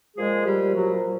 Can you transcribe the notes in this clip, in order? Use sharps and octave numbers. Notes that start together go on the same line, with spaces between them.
A#2 F3 G#3 G#4
G3 G4
F#3 F#4